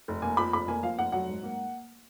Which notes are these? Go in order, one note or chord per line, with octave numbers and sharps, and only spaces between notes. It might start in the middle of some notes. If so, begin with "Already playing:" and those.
F1
A#3 G#5
F2 B5
F1 B5
A#3 G#5
F3 F5
F1 F#5
F#3 F#5
G#2
A#3